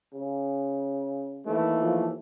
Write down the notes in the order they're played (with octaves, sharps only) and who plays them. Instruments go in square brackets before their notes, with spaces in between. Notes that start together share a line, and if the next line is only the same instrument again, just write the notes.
[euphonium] C#3
[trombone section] D#2 E3 A3
[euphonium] F3